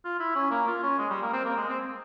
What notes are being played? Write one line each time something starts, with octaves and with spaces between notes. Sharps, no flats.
F4
E4
C#4
A#3
F4
C#4
G#3
G3
A#3
C4
A#3
G#3
C4